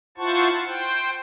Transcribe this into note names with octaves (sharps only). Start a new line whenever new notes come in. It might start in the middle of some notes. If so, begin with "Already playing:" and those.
E4 F4 C5 F#5 A5 C#6
C5 G5